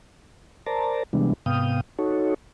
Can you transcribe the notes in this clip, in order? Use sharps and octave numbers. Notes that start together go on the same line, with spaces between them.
A#4 C5 D5 A5 A#5
C3 E3 G3 G#3 B3 D4
G#2 C3 B3 F5 G5 D#6
D#4 F#4 A4 C#5